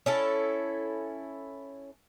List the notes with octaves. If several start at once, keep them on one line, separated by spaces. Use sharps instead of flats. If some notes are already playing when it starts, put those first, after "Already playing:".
C#4 E4 A4